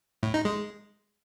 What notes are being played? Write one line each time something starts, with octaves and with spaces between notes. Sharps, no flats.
A2
D#4
G#3